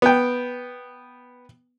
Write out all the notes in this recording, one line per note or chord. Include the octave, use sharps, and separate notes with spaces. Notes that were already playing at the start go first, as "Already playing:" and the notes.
B3 G5